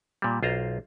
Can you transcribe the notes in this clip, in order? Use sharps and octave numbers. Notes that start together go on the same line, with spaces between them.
A#2 G3
B1 F4 C5 A#5